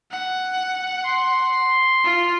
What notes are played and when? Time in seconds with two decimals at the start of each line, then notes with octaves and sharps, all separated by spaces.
0.11 F#5
1.05 C6
2.04 F4